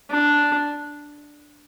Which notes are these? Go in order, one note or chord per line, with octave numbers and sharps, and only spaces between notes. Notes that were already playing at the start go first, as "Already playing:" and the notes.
D4